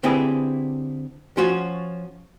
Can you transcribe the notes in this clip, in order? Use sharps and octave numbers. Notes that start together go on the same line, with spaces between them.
D3 C4 E4 G4 G#4 B4
F3 C#4 F4 F#4